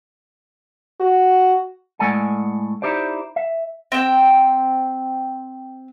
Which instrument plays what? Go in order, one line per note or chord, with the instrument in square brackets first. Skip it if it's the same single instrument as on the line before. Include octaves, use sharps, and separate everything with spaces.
[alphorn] F#4
[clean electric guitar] A2 G#3 A4 D5 F#5 G#5
D#4 E4 G4 C5 D5
E5
[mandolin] C4 G5